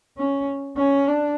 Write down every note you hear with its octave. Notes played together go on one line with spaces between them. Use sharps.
C#4
C#4
D4